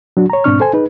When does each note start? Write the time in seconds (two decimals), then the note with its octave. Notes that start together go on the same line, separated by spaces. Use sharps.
0.17 F#3 D4 F#4
0.30 C#5 A#5
0.44 G#2 B2 C4 D4 C#6 F6
0.60 A4 C5 G#5
0.73 D#4 G#4 B4